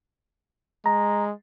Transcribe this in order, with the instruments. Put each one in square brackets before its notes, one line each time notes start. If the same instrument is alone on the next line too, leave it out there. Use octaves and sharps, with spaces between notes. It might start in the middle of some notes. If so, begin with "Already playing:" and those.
[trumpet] G#3 [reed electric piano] A#5